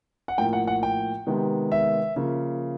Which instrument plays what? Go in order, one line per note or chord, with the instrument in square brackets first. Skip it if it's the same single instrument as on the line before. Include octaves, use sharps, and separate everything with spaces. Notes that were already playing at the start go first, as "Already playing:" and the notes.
[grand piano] F#5
A2 F3 A#3 G5
F#5
F#5
G5
C3 D#3 G#3 B3
E5
C#3 F3 A#3